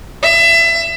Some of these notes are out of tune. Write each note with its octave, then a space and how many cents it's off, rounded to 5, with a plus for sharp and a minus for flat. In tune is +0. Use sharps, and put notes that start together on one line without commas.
E5 +25